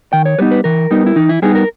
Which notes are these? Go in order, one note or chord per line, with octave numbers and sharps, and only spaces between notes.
D#3 G5
C#5
G3 B3 D#4 B4
B4
E3 A#4
G3 B3 D#4
E4
E3 D#4
E4
G3 B3 D#4 G#4
A#4